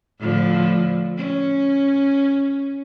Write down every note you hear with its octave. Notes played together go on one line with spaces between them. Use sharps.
A2 D3 F3
C#4